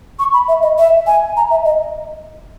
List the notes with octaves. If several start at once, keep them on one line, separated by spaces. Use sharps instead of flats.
C#6
B5
E5
D#5
E5
G#5
A#5
E5
D#5